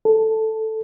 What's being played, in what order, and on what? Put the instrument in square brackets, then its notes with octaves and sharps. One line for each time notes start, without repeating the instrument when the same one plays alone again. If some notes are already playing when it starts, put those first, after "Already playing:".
[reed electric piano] A4